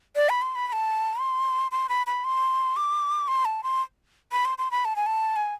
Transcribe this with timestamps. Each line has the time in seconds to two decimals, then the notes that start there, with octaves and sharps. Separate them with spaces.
0.16 D5
0.29 B5
0.42 C6
0.55 B5
0.68 B5
0.73 A5
1.19 C6
1.72 C6
1.89 B5
2.07 B5
2.24 C6
2.76 D6
3.28 C6
3.45 A5
3.63 C6
4.32 B5
4.45 C6
4.58 C6
4.71 B5
4.85 A5
4.96 G#5
5.06 A5
5.36 G#5